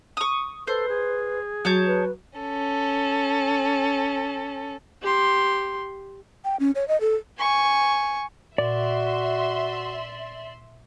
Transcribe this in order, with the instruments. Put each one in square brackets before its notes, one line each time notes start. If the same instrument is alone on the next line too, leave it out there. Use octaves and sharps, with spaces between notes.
[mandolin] C#6 D#6
[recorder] A4 [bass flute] B4 [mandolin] C5
[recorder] G#4
[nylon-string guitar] F#3 [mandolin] C#5 A5 G6
[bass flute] B4
[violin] C#4 A4
[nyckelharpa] G4 C6
[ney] G5
C#4
C#5
D#5
A4
[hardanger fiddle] G#5 C#6
[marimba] A#2 [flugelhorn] F#4 [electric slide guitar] D5 [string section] E5 C6